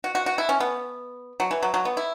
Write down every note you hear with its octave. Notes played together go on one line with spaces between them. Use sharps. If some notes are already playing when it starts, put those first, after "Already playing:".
F#4
F#4
F#4
E4
C#4
B3
F#3
E3
F#3
F#3
B3
E4